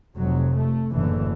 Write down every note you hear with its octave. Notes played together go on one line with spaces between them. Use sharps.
F1 F#3
A3
F#1 A2 D3 E3